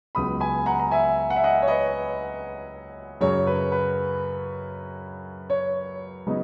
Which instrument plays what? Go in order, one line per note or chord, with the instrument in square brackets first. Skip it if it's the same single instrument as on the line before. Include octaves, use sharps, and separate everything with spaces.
[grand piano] C#2 C#3 F#3 B3 B5 D#6
G#5 B5
F#5 A#5
A#5
E5 G#5
F#5
E5
D#5 F#5
C#5
B4 D#5
F#2 C#3 F#3 C#5
B4
B4
C#5
C#3 F#3 B3 D#4